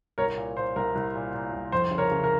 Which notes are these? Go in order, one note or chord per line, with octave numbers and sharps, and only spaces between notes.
C2 A#4 C#5
A#2
A#2 C5
C2 A#4
C2
A#2
A#2
C2
F2 C5
C#3
A#4 C#5
C#3
A#4